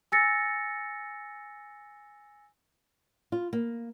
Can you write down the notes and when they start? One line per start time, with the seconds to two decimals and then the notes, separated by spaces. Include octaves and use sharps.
0.12 G#5 E6 A6 A#6 C#7
3.32 F4
3.53 A#3